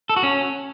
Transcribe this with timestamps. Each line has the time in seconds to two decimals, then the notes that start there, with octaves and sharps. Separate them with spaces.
0.09 A4
0.16 F#4
0.23 C#4